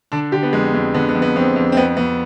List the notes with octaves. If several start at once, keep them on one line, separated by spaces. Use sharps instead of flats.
D3 D4
D3 G4
B3
F2 G#3
F2
D3 B3
B3
F2
B3
F2 C4
F2
C4
F2 B3
F2 B3